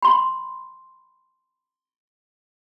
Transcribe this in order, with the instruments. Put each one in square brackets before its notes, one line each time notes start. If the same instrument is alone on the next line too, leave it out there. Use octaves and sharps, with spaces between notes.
[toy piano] B5 C6